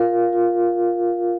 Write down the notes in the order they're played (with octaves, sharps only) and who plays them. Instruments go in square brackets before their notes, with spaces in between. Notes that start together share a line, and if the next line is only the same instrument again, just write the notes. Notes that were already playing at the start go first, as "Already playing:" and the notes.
Already playing: [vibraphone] F4 A#4 F5
F4